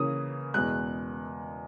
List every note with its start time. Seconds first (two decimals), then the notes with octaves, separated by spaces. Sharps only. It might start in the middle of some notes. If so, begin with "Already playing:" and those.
Already playing: C#3 E3 A#3 C#4 D#6
0.54 E2 B2 G#3 F#6